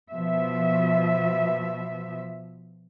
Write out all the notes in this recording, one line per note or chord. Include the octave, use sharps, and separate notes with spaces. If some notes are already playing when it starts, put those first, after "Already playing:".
B2 F3 E5